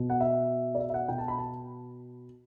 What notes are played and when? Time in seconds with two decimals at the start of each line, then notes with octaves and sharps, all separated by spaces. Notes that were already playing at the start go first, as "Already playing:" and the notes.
Already playing: B2
0.10 F#5
0.20 E5
0.75 D5
0.79 E5
0.90 E5
0.94 F#5
1.08 B2 G5
1.18 A5
1.28 B5
1.38 A5